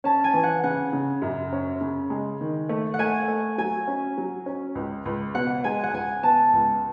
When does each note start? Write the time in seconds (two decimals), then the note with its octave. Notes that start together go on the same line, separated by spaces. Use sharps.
0.04 C#4 A5
0.24 G#5
0.34 E3
0.44 F#5
0.63 C#3 F#5
0.93 C#3
1.22 F#2
1.52 C#4
1.81 C#3
2.10 G#3
2.41 D#3
2.69 A3
2.94 F#5
2.99 A3 G#5
3.28 A3
3.58 F#3 G#5
3.87 C#4
4.18 F#3
4.46 C#4
4.75 C#2
5.06 C#2
5.35 B2 F#5
5.64 G#3 G#5
5.84 F#5
5.93 C#2 G#5
6.23 B3 A5
6.53 C#2